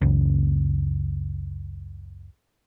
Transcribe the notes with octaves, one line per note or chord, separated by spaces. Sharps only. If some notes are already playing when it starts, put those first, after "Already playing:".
F#1 C#2